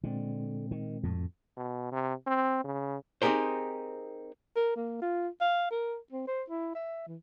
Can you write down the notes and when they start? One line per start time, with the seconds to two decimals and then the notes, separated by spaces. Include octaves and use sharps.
0.04 A#2 D3 G#3 C4
0.71 D#3
1.03 F2 A2
1.57 B2
1.92 C3
2.27 C4
2.64 C#3
3.22 C4 D#4 G4 G#4 A#4 C5
4.56 A#4
4.76 A#3
5.02 F4
5.41 F5
5.71 A#4
6.12 C4
6.27 C5
6.49 E4
6.75 E5
7.08 E3